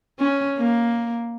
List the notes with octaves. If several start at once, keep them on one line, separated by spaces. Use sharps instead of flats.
C#4
A#3